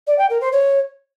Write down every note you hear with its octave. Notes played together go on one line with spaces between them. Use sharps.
D5
G5
A#4
C5
C#5